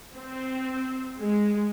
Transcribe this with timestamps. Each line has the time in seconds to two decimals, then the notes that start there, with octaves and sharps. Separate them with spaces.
0.15 C4
1.20 G#3